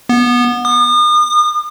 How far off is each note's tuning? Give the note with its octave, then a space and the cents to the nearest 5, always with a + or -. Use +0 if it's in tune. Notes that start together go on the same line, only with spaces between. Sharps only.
B3 -20
D#6 -40